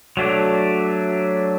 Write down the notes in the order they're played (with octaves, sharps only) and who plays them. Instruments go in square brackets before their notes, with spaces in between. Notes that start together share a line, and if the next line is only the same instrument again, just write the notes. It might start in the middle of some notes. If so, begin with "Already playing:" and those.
[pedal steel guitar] F#3 A3 D4